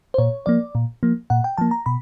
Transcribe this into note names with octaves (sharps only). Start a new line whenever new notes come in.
C5
A#2 C#5
F3 A#3 D5
A#2
F3 A#3
A#2 F#5
G5
F3 A#3 A5
A#5
B2 B5